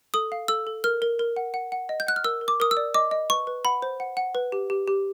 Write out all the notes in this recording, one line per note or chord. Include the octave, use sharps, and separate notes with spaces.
A4 D#6
F5
A4 E6
A4
A#4 F6
A#4
A#4
F#5
F#5
F#5
D#5
G6
F#5 F#6
F6
A#4 E6
A#4
D6
A#4 D#6
E6
D5
D#5 D6
D#5
B4 C#6
B4
F#5 B5
C5
F#5
F#5
B4
G4
G4
G4